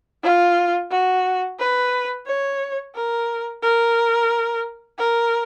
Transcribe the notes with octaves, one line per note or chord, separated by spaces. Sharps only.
F4
F#4
B4
C#5
A#4
A#4
A#4